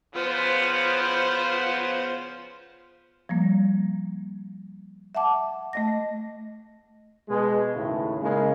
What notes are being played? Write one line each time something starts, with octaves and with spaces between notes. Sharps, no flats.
C#3 F3 B3 F4 C5
F3 G3 A#3
E5 F#5 A5 D6
A3 D#5 A#6
B2 G#3
D#2 A2 C#3 A3
C#3 G#3 A#3